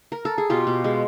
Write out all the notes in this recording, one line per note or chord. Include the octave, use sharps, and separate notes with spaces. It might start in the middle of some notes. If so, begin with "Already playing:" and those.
A#4
A4
G#4
B2 F4 G4
B2
G#3